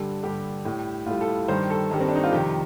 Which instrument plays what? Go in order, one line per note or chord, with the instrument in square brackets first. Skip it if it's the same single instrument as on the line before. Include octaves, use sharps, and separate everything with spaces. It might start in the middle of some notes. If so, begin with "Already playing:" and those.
Already playing: [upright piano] G2 D3 G3 A4
G2 D3 G3 G4
A2 G3
A2 G3 F4
A4
G2 D#3 G3 C5
A4
G2 D#3 G3
C4
D4
D#4
F4
F2 C3 D#3 G3 G4